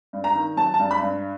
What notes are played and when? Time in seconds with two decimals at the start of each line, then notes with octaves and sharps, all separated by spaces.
0.13 G2
0.24 A#5
0.35 D#3
0.57 F#3 A5
0.74 A5
0.79 G2
0.91 B5
1.02 G2